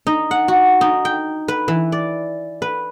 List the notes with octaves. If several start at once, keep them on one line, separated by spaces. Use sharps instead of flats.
D#4
F#5
F#4
D#4
G5
B4
E3
D5
B4